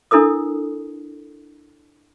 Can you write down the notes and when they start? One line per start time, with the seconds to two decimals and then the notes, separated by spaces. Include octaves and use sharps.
0.11 D4 E4 A4 A#4 D#6